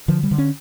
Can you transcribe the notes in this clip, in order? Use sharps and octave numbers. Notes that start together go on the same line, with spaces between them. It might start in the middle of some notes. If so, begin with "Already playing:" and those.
D3 F3
G3
D3
C#4